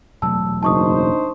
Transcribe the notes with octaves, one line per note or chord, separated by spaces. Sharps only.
E1 F#3 A3 A5 E6
F#1 D4 D#4 C5 A5 C#6 D#6